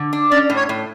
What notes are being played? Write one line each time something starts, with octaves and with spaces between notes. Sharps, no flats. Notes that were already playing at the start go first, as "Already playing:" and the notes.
Already playing: D3
D4
C#4 D5
A2
C#5
A2